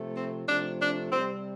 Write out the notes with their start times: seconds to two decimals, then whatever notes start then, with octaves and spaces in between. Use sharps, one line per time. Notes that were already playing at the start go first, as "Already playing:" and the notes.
Already playing: C3 F3 A3
0.14 C4
0.46 C3 F3 A3 D4
0.80 D4
1.11 C3 G3 C4